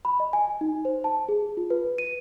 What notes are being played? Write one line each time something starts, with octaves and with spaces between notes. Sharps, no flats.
B5
D#5
G#5
D#4
C5
A5
G#4
F4
B4
D#7